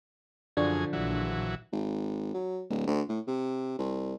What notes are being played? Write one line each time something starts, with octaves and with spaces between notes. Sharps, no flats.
F#2 D3 F3 D4 G#4 C#6
A#1 E3 F#3
G#1
F#3
D1
D2
A2
C3
C2